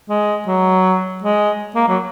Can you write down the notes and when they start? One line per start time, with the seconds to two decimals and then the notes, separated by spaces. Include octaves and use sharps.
0.09 G#3
0.47 F#3
1.24 G#3
1.75 A#3
1.88 F#3